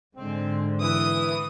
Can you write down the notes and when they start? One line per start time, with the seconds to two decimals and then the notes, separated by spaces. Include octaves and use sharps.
0.16 G#2 D3 G#3 C4
0.80 E3 D#6